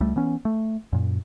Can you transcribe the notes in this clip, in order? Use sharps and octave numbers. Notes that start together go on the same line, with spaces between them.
C#2 G3 A3
E3 B3 C#4
A3
F#2 A#2